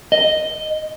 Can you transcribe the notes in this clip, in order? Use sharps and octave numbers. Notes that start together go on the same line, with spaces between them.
D#5